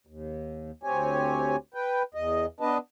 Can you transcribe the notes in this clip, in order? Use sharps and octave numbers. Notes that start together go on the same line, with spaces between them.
D#2
D2 C4 G4 C#5 G#5
B4 G5
E2 D#5
B3 D4 B4 D#5 A5